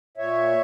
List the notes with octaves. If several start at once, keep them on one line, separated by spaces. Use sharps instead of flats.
A#2 C#5 E5